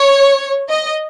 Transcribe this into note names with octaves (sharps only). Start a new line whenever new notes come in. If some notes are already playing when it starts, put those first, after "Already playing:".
Already playing: C#5
D#5